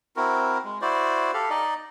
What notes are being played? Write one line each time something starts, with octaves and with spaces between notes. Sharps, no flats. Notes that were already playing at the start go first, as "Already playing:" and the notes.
C4 E4 F#4 A#4
G#3
E4 F#4 C5 D5
G4 A4 F5
D#4 D5 D#5